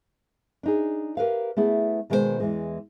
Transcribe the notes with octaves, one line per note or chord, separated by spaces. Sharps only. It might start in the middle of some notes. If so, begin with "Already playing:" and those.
D4 D#4 G#4
G4 A#4 B4 F5
A3 B3 E4 G#4
B2 D#3 G#3 A#3 G4 C5
E2 E3 G#3